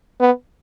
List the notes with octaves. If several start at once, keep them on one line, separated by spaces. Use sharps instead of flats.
B3